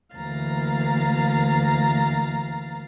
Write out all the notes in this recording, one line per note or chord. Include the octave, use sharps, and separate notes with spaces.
D2 E3 A#3 F5 A#5 A6